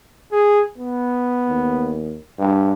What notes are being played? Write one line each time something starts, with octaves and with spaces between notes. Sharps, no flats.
G#4
B3
D#2
G2